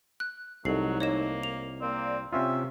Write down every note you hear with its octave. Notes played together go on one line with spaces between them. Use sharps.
F#6
C2 F#3 A3 D#4 A4 C7
A#3 C#5 D#5 E7
F7
A#3 C4 D5
C3 C4 C#4 F4 E5